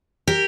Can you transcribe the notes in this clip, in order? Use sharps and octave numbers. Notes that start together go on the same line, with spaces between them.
G4 A#4